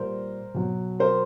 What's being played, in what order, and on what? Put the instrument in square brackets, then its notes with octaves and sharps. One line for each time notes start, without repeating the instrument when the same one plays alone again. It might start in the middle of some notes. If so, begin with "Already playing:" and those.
Already playing: [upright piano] A#2 G3 A#4 C5
B2 F#3
A#4 C5